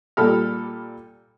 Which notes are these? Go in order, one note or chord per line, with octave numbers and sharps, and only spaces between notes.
A#2 G3 A4 B5 F6